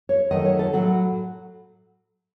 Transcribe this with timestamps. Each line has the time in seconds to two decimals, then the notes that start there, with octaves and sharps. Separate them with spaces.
0.09 C#5
0.31 D#3 F#3 A3 D#5
0.45 C#5
0.59 A4
0.73 A2 F#3 A3 F#4